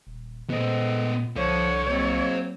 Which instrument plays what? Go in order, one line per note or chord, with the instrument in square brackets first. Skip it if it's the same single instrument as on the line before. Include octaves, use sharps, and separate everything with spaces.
[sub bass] D#1
[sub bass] A#2 [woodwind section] G#3 A4 D#5 [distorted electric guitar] B3 C5
[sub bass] C2 [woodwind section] F3 [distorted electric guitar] A4 D5 [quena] C#5
[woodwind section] F#3 A#3 C4 [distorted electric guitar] C5 D#5